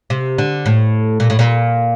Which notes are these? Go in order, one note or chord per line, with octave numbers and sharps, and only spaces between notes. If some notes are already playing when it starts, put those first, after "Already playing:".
C3
D3
A2
A#2
A2
A#2